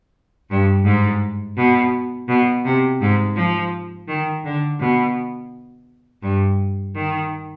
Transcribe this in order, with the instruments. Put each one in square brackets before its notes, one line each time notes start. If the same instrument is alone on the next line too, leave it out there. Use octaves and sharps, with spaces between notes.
[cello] G2
G#2
B2
B2
C3
G#2
F3
D#3
D3
B2
G2
D#3